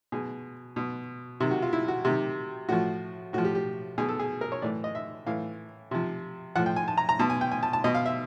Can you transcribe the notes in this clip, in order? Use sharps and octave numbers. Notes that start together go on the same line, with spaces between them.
B2 G#4
B2
C3 D#3
F#4
F4
E4
F#4
C3 D#3 G4
A2 F3 F#4
A2 F3 F#4
G4
G4
B2 G#4
A4
G#4
A#4
C#5
A2 E3 D5
D#5
E5
A2 E3 F5
C3 F3
A2 F3 F#5
G5
G#5
A5
A#5
A#5
B2 A5
G#5
G5
G#5
A5
A5
B2 D#5
F5
E5